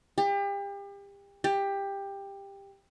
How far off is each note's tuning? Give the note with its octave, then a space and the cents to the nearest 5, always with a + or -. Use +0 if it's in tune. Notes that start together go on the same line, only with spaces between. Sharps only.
G4 +35
G4 +15